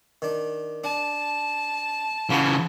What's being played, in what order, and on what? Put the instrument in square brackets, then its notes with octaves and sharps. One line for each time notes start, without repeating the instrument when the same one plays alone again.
[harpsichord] D#3 D4
[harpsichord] D4 [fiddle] A5
[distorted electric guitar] C#3 E3 [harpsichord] F4 F#4 G5